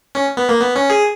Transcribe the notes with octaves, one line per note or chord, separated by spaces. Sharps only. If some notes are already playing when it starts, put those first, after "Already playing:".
C#4
B3
A#3
B3
C#4
G#4